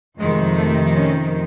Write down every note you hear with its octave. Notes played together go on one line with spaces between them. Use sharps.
F2 C3 D#3 G#3
A3
C#4